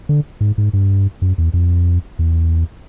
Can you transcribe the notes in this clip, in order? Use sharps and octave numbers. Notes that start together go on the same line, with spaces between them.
D3
G#2
G#2
G2
F#2
E2
F2
E2